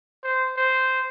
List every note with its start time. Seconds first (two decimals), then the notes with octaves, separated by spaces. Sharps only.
0.23 C5
0.57 C5